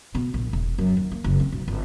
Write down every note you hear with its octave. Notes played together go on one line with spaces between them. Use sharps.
B2
A#1
E1
F#2
D#2
A#3
F#1
C4
B1
G1